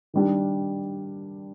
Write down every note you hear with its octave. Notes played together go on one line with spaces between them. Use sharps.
D#3 G3 D4